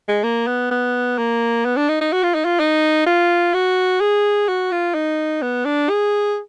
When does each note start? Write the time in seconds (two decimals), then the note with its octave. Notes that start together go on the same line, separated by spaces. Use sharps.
0.08 G#3
0.24 A#3
0.47 B3
0.71 B3
1.18 A#3
1.65 B3
1.77 D4
1.88 D#4
2.01 D#4
2.12 F#4
2.23 F4
2.35 D#4
2.45 F4
2.60 D#4
3.06 F4
3.54 F#4
4.00 G#4
4.48 F#4
4.71 F4
4.94 D#4
5.42 B3
5.65 D4
5.89 G#4